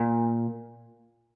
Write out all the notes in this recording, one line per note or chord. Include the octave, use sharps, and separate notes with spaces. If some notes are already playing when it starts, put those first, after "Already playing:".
Already playing: A#2